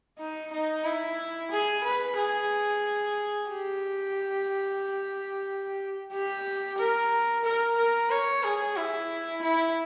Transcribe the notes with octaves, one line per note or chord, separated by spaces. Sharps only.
D#4
D#4
E4
G#4
B4
G#4
G4
G4
A#4
A#4
A#4
C#5
G#4
E4
E4